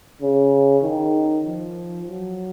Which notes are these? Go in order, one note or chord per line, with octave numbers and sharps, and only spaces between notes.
C#3
D#3
F3
F#3